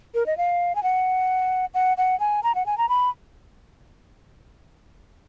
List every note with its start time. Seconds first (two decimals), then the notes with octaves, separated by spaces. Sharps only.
0.14 A#4
0.26 D#5
0.37 F5
0.75 G#5
0.83 F#5
1.74 F#5
1.97 F#5
2.20 G#5
2.43 A#5
2.55 F#5
2.66 G#5
2.78 A#5
2.89 B5